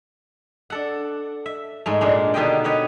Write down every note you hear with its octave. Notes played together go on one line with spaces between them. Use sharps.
D4 A4 F#5
E5
G#2 G#3 A3
A#2 G#3 D4
B2 D3 D#3 G4 D#5 G5
G4 B4 C#5 D#5